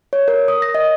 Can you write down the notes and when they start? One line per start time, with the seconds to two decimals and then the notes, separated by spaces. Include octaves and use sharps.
0.13 C#5
0.28 A#4
0.48 D#6
0.62 A#6
0.75 D#5